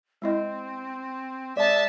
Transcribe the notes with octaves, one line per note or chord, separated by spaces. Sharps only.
G#3 C4 E4 D#5
G#3 D5 E5 A5